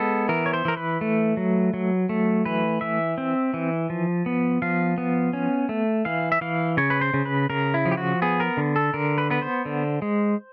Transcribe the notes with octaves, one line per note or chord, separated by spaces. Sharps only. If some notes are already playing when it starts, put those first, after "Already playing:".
Already playing: G#3 B3 A4
E3 A#4
C#5
C5
E3 A#4
B4
A3
F#3
F#3
A3
E3 B4
E3 E5
C4
E3
F3
B3
F3 F5
B3
C#4
A3
E3 F5
E5
E3 F5
C#3 C#5
B4
C5
C#3
B4
C#3 A#4
E4
F3
G4
F#4
B3 G#4
A#4
D3
A4
D3 A#4
B4
B3 B4
C5
D3
G#3